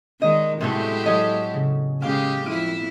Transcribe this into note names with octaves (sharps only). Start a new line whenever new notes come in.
D#3 G#3 D#5
A2 C3 F#3 G#3 A3 B3 E4 G4
F#3 A4 C#5 D#5
C#3
C#3 G#3 G4 F5 G5 D6
F2 E4 F6 D7 D#7